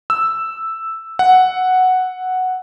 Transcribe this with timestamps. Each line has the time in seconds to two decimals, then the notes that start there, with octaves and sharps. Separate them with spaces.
0.10 E6
1.19 F#5